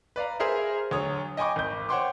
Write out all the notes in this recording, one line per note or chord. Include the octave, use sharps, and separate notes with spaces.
B4 D5 F5 A#5
G#4 A#4 C5 E5
D2 F#3 C#5 D#6
D#5 G5 G#5 B5 C#6 D6
G#1 G6
C5 C#5 F#5 G5 C6 D6